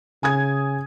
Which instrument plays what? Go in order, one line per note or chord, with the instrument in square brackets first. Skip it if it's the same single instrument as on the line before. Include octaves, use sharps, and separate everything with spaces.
[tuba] C#3 [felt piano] G#5 D#6 G#6